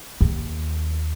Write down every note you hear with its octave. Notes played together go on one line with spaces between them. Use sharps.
D#2